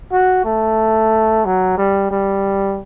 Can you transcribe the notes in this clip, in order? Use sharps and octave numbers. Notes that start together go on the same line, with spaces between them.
F#4
A3
F#3
G3
G3